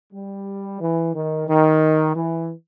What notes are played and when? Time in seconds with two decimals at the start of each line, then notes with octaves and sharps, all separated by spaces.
0.13 G3
0.80 E3
1.14 D#3
1.48 D#3
2.15 E3